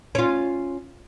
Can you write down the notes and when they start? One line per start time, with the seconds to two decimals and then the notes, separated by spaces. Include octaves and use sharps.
0.15 C#4 F4